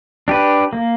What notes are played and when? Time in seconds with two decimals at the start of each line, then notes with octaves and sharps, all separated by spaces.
0.28 D4 G4 B4
0.73 A#3